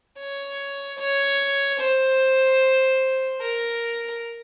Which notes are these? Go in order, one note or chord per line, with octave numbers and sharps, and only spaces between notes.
C#5
C#5
C5
A#4